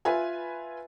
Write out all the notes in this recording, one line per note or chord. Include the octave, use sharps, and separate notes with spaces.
F4 B4 E5 G#5